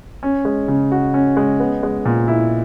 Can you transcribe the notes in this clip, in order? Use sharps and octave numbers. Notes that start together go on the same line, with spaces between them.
C#4
G#3
C#3
F#4
C#4
G#3
B3
G#3
A#2
E4